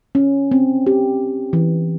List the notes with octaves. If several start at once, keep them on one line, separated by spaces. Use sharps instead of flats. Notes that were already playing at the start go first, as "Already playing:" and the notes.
C#4
C4
G4
E3